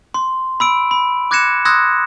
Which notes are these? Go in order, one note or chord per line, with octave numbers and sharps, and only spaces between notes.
C6
B5 E6 D7
B5
D6 F#6 G#6 A#6 C#7 E7
C6 D#6 E6 F#6 G#6 A#6